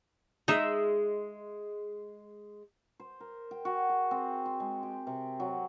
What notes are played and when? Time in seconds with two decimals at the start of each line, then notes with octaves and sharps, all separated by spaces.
0.48 G#3 D#4 D#5 E5
3.00 C5
3.20 A#4
3.51 G5
3.65 F#4
3.89 G#4
4.11 C4
4.46 C6
4.60 G#3
4.83 G4
5.07 C3
5.40 F#3